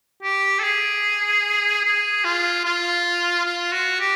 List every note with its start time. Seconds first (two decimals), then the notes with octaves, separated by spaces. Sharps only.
0.23 G4
0.59 A4
0.64 G#4
1.85 G#4
2.24 F4
2.65 F4
3.45 F4
3.72 F#4
4.00 G4